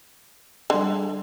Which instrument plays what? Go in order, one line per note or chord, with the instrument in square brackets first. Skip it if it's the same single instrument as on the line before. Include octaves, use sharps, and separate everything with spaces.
[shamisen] D3 [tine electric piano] G3 G#4